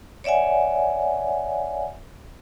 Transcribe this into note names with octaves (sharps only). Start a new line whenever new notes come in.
C#5 D5 E5 F#5 G#5